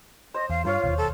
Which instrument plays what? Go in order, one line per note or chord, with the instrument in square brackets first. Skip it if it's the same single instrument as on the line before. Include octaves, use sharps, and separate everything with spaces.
[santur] C5 D#6 [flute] D#5
[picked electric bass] E2 [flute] F5
[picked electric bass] G2 [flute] F4 [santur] C5 C#5 F5
[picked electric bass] E1 D#2
[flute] A4